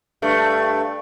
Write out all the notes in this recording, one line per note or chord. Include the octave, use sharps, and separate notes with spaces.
G2 A3